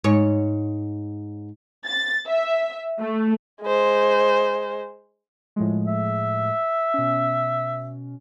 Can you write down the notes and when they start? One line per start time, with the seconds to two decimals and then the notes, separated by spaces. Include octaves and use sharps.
0.04 G#2 C#5
1.87 A6
2.27 E5
3.00 A3
3.62 G#3 C5
5.56 A2 F3 G#3
5.87 E5
6.94 B2 C#4